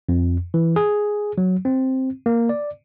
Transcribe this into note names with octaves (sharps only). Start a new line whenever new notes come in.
F2
E3
G#4
F#3
C4
A#3
D5